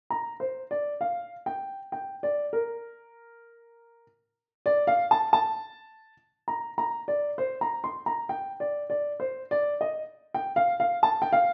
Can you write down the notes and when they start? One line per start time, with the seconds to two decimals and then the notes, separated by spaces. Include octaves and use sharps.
0.10 A#5
0.40 C5
0.71 D5
1.01 F5
1.46 G5
1.92 G5
2.23 D5
2.53 A#4
4.66 D5
4.87 F5
5.11 A5
5.33 A5
6.48 A#5
6.78 A#5
7.08 D5
7.38 C5
7.61 A#5
7.84 C6
8.06 A#5
8.29 G5
8.60 D5
8.90 D5
9.20 C5
9.51 D5
9.81 D#5
10.34 G5
10.56 F5
10.80 F5
11.03 A5
11.22 G5
11.33 F5